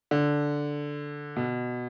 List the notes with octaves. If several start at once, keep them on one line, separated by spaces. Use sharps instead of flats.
D3
B2